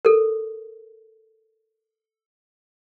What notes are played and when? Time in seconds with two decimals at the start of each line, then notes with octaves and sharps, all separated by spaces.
0.05 A4 A#4